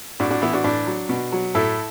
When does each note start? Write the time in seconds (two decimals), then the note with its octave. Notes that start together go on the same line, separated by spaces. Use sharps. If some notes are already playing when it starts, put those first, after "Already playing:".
0.20 A2 D4 F#4
0.30 D4 F#4
0.42 E3 B3 E4
0.53 D4 F#4
0.64 A2 D4
0.87 F#3
1.09 B2
1.32 F#3
1.55 A2 E4 A4